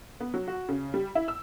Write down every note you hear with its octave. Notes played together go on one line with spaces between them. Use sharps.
B3
F#3
F#4
C#3
G3
E4
E6